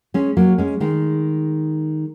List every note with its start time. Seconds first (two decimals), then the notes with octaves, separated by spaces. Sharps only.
0.14 G#3 C#4
0.37 F#3 A#3
0.58 G#3 C#4
0.80 D#3 G#3